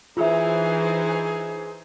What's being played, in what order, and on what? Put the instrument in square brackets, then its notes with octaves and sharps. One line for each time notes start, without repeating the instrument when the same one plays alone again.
[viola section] E3 D#4 C5 [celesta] F4 E5 [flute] G#4